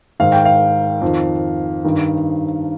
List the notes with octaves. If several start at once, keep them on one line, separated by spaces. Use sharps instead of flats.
G#2 D#3 F5
G5
F5
F2 D#3
G2 D#3